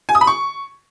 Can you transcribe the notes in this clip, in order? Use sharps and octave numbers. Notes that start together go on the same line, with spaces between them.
G#5
D#6
B5
C#6